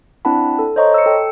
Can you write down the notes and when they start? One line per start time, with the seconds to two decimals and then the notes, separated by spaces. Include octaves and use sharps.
0.25 C4 D4 E4 F#5 A5 B5
0.59 A4
0.76 C5 C#5 D#5 A#5 C#6
0.94 E6 C#7
1.06 A4 G5